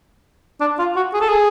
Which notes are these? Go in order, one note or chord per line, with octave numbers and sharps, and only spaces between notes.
D4
F4
F#4
G#4
A4
G#4